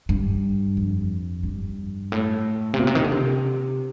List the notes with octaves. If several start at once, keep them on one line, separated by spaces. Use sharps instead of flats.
G2
F2
G2
A2
C3
A#2
C3
D#3
D3
C3